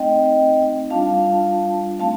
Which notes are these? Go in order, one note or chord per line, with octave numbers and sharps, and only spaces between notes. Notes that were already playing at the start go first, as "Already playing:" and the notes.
Already playing: A3 C4 D#4 D#5 G5
G3 D4 F4 F5 A5
A3 C4 D#4 F5 A5